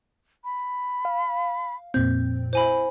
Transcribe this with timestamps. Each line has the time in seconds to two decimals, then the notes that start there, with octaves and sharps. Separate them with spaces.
0.44 B5
1.05 F5
1.94 F2 A#2 C4 G6
2.53 E4 C5 G#5 B5